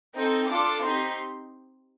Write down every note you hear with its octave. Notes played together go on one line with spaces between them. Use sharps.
C4 D#4 A4 G5
D4 F4 A4 D6
C4 D#4 G4 C6